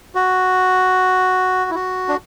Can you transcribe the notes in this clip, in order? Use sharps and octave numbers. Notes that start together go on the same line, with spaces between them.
F#4
E4
F#4
D4